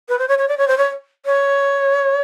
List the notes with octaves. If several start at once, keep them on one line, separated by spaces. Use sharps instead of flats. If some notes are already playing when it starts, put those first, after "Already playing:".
B4
C5
C#5
C#5
D5
C#5
C5
C#5
C#5